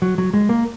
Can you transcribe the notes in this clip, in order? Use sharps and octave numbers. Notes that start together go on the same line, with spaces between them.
F#3
F#3
G#3
A#3